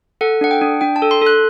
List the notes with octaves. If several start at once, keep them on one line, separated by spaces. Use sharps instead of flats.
A4 F#5
D4 F#5
G5
D4
D4 G5
A5
A4
C6
A4
F#6